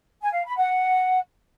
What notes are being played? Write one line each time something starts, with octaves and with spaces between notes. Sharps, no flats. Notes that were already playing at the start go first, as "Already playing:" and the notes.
G#5
F5
B5
F#5